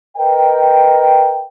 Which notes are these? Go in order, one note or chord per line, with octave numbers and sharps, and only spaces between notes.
A#4 B4 D#5 G5